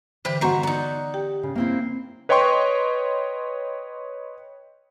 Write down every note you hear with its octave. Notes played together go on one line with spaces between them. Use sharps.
D3 E3 G4 B4 C5
D#3 B3 F#4 C5 F#5 A#5 C#6
D#4 D5 F#5
G4 G5
C#3
A#3 C4 E4
B4 C#5 D#5 G5 C6 C#6